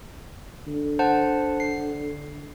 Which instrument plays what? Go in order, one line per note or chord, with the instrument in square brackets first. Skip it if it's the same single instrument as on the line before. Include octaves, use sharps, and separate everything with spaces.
[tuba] D3
[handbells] C5 F#5 A5
C7